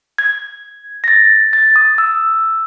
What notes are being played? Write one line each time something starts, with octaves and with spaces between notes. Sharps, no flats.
G#6
A#6
A6
A6
D#6
E6